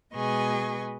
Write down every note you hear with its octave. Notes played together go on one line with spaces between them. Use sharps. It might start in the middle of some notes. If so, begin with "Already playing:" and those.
B2 G#3 G#4 B4 D#5 C#6